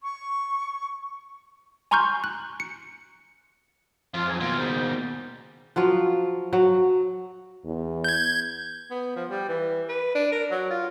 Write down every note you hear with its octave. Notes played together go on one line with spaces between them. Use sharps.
C#6
G#5 A#5 C6 C#6 F6 G6
F#6
C#7
F2 F4
G#2 F#3 G#5
D#2 B2 F4
G#2 C#3 G3
F3 F#3 F4
F#3
E2
G6 G#6
B3
F3
G3
E3
B4
D4
A#4
F#3
F4